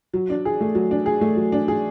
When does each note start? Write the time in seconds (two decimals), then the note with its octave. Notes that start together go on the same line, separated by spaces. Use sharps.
0.14 F#3
0.30 D4
0.45 G#4
0.61 A3
0.75 F#3
0.91 D4
1.06 G#4
1.21 A3
1.37 F#3
1.52 D4
1.68 G#4